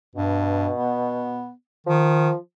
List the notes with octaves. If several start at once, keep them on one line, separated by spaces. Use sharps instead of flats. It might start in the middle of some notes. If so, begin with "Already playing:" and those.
G2 B2
B3
D#3 F3